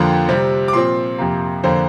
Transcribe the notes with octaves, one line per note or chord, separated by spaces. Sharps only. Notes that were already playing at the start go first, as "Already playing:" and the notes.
Already playing: F2 D3 F3 A#3 A#5
C3 G3 C4
D6
A#2 F3 C4 C6
F2 C3 A#3
F2 D3 A#3 C5